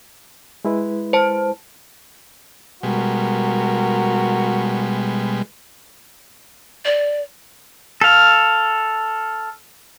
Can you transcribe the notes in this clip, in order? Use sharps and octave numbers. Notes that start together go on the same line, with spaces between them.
G#3 E4 B4
C5 A5
B2 G3 G#3 F#4 A#4
D5
A4 F5